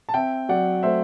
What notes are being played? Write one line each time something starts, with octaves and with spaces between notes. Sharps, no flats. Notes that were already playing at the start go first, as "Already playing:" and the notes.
A5
C4 E5 G5
F#3 D5 F#5
A3 C5 E5